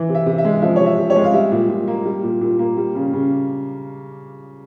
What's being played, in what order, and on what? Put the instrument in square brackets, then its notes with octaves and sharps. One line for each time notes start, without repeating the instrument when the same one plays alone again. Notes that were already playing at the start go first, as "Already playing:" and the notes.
Already playing: [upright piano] E3
C3
E5
C3
E5
G#3
F3 E5
C3 C#5
E5
C3
C#5
G#3
F5
G3 E5
A#2
A#2
A#3
G3
A#2
A#2
A#3
G3
C#3
C#3